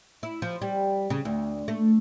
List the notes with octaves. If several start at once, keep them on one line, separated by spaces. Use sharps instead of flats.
E4
F3
G3
C#3
D2
A3